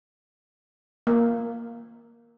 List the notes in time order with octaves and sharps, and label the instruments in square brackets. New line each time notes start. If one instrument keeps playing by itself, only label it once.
[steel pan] A#3